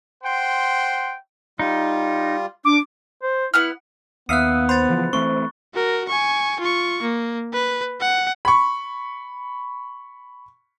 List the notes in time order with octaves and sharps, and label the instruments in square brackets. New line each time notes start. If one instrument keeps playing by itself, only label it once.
[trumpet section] C5 F#5 G5 C6
[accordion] G3 F4 [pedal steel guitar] D#4
[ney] D4 [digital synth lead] D6
[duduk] C5
[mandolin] B3 F#5 F6 [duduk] E4
[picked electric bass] D#2 [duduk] B3 [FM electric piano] E5 F5 D#6 [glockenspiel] F#6 C#7
[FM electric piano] C5 [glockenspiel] B5 A6
[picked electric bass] C#3 E3 F3
[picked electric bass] E3 A3 C4 [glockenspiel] C#6
[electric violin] F#4 A#4
G#5 C#6
F4 C#6
A#3
B4
F#5
[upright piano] B5 C#6